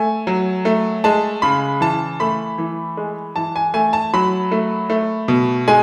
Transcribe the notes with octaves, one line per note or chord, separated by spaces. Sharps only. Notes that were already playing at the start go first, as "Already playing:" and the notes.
Already playing: A3 G#5
F#3
A3
G#3 A5
C#3 B5
E3 A5
A3 B5
E3
G#3
E3 A5
G#5
A3 G#5
A5
F#3 B5
A3
A3
B2
G#3 G#5